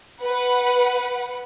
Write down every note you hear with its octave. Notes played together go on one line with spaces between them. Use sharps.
B4 F#5